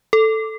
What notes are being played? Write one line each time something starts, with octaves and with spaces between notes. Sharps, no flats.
A4